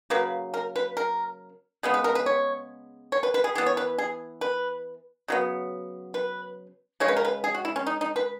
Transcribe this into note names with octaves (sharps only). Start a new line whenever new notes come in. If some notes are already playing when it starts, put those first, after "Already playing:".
C#3 F#3 A#3 B4
A#4
B4
A#4
C#3 G#3 B3
B4
A#4
B4
C#5
C#5
B4
B4
G#4
E3 B3 G#4
C#5
B4
G#4
B4
C#3 F#3 B3
B4
C#3 G#3 C#5
B4
A#4
B4
G#4
F#4
E4
C#4
D#4
D#4
B4